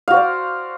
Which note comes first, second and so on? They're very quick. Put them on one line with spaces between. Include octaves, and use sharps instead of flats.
F5 F#4 C5 D5